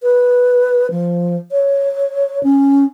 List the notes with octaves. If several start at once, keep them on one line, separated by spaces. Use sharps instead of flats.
B4
F3
C#5
C#4